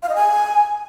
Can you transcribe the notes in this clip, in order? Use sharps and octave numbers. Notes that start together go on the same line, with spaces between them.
F5
D#5
G#5